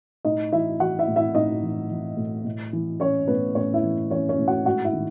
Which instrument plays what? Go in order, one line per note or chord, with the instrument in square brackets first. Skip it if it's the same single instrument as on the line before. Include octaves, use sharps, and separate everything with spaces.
[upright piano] A2 D#4 D#5
E3 E4 E5
E3 F#4 F#5
E4 E5
A2
E4 E5
A2 D#4 D#5
E3
E3
A2
A2
E3
E3 C#4 C#5
A2 B3 B4
A2 C#4 C#5
E4 E5
E3
E3 C#4 C#5
C#4 C#5
A2
F#4 F#5
G#2 F#4 F#5
E4 E5
D#3